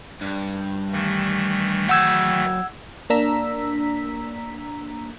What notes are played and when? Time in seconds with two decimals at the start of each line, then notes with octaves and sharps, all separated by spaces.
0.21 G2
0.93 D#3 E3 A3
1.89 F#3 F#5 G5 E6 G#6
3.10 A#3 D4 A#5 E6 B6